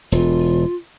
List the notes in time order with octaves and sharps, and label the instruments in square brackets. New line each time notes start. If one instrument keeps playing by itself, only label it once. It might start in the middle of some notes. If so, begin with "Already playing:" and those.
[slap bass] E1 [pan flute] F4